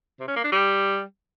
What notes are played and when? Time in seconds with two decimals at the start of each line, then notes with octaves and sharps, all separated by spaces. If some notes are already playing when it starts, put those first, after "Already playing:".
0.20 C3
0.28 C#4
0.36 A#3
0.44 D4
0.52 G3